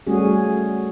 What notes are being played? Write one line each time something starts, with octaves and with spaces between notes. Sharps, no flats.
G3 A3 C#4 F#4 G#4